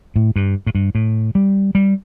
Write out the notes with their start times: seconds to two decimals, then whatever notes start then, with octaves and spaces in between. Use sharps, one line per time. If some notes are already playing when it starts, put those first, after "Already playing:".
0.16 A2
0.36 G2
0.67 A2
0.75 G2
0.95 A2
1.35 G3
1.75 G3